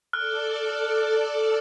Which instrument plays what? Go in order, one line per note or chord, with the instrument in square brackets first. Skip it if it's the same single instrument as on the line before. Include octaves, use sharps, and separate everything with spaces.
[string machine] A4 D5 [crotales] F6 F#6